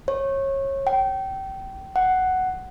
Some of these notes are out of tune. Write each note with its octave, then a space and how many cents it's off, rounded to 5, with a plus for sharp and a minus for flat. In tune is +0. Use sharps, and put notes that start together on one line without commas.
C#5 -25
G5 -25
F#5 +5